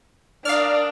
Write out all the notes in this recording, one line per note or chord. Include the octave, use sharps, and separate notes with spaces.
D4 A#4 D5 F5 D#6 F6